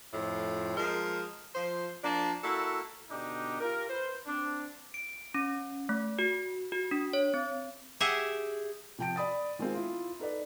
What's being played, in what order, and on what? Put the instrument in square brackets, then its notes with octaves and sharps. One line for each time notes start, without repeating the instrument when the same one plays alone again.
[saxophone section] F2 A2
F3 G#3 A#4
F3 C5
F3 A#3 D4
A#3 E4 F#4 A4
[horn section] B2 D3 D4 D#4 G4
F4 G4 A#4
B4 C5
C4 D4
[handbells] D7
C#4
A3
F#4
F#4
D4
C#5
C4
[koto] G4 G#4 E5 F#5
[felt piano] C3 F3 G5 A5 D7
D5 B5 D#6 A6
D#3 G#3 A#3 C4 F4
E4 F4
D#4 A4 B4 D5